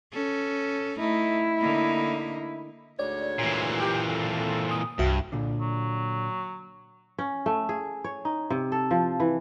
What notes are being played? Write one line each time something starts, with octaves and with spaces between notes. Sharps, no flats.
C#4 A4
A3 D#4 E4
D3 A#3 D#4
D2 G#2 C#5 D5
A#2 E3 C7
G4
C4 A4
D#6
C2 G2 F#4 E5
A#2 D3
F#3
C#4
A3
G#4
C#5
D#4
C3
A4
F3
E3